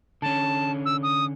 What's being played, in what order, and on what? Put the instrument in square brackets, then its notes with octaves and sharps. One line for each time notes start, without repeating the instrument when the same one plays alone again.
[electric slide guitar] D3 C#4 [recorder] A5
[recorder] E6
D#6